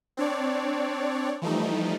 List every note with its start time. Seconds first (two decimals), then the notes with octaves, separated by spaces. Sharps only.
0.17 C4 D4 C#5 D5
1.42 E3 F3 G3 A3 D#4